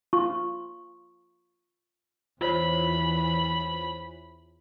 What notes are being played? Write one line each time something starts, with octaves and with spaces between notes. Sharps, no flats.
F4 C#6
E2 E3 F4 C5 C#5 B5